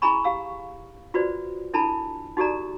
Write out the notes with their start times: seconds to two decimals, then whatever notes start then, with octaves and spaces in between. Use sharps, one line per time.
0.02 E4 G#4 G#5 A#5 B5 C#6
0.24 G4 F5 E6
1.14 F4 F#4 B4 C5 D5
1.74 D4 E4 A4 A5 B5
2.37 D#4 F#4 G4 A4 D5 A#5